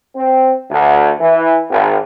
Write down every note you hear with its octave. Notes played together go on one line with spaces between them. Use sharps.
C4
D2
E3
G#1